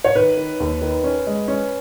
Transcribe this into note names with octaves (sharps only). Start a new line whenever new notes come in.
C#5
D#3 B4
D#3
D#2
D#3
C#4
G#3
C#4